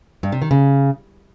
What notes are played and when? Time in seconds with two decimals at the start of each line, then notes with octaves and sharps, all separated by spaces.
0.23 G2
0.32 C3
0.42 D#3
0.51 C#3